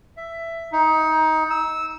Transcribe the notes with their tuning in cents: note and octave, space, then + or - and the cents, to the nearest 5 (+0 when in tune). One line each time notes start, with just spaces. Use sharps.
E5 +10
D#4 +20
E6 -15